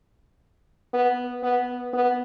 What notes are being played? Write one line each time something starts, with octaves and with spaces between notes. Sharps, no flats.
B3
B3
B3